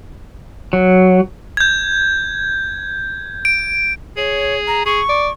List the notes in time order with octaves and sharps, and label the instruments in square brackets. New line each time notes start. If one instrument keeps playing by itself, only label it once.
[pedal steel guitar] F#3
[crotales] G6 G#6
D7
[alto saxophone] G#4 [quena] C#5
[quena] A#5
[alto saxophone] G#4 [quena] C#6
[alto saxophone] D5